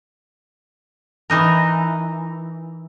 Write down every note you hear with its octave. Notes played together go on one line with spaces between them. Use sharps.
E3 D#4 A#4